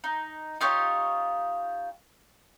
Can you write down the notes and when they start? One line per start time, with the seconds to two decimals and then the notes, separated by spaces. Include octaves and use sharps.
0.04 D#4
0.61 D#4 F4 G4 C#5